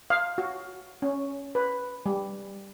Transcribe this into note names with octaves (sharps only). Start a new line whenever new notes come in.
F5
F#4
C#4
B4
G3